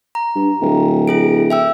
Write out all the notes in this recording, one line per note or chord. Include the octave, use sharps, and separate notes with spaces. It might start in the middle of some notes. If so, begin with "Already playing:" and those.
A#5
G2
D1
E4 G#4 D7
E5 G5 E6